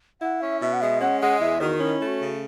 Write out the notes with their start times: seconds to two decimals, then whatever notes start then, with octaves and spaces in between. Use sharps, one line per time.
0.21 E4 F#5
0.41 C#4 E5
0.61 B2 E5
0.73 F#5
0.81 G#3 E5
1.01 C#4 F#5
1.21 G#3 F#5
1.40 E2 E5
1.60 D#3 F#4
1.80 C#4 E4
2.00 A3
2.07 F#4
2.21 C#3